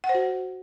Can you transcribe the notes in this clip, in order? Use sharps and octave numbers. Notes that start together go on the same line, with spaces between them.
F#5
C5
F#4